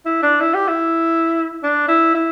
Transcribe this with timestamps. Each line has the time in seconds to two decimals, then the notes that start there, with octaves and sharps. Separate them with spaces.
0.05 E4
0.23 D4
0.41 E4
0.55 G4
0.68 E4
1.63 D4
1.88 E4
2.15 E4